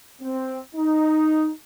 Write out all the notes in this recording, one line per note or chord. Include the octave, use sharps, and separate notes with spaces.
C4
D#4